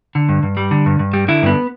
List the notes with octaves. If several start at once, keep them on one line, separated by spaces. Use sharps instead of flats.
D3
G2
G2
G3
D3
G2
G2
G3
D3 E4
G2 B3